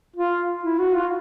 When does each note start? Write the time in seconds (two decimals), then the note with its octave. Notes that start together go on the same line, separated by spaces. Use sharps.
0.16 F4
0.63 E4
0.79 F#4
0.95 F4